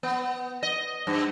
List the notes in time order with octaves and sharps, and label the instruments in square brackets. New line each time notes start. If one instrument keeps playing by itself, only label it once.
[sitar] B3
D#5
G2